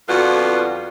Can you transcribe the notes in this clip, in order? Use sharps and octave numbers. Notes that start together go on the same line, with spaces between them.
F2 D3 G3 B3 F4 F#4